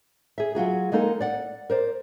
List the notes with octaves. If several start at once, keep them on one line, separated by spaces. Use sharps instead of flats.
G#4 E5
F#3 F4 F#4 G#4
G#3 A#3 D#4 A4 A#4
D5 F#5
A#4 C5 D5